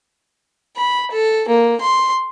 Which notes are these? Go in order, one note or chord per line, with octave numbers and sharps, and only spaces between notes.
B5
A4
A#3
C6